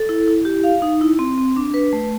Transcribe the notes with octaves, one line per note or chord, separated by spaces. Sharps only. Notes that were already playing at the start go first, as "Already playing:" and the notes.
Already playing: A4
E4
E4
G4
F5
D#4
E4
C4
C4
D4
B4
A3